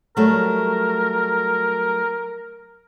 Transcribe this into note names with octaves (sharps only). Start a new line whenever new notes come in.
F#3 G3 A3 A#4